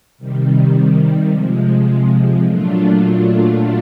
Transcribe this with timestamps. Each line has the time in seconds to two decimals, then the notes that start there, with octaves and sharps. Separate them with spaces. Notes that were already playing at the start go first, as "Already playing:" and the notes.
0.18 C3 D#3 G3
1.30 C3 F3 G#3
2.42 A#2 F#3 A3 D4 F4